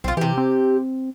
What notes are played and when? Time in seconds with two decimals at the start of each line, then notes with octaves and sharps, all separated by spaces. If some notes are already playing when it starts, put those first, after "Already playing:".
0.04 B1 C4 F4
0.17 C3 E3 G4
0.38 C4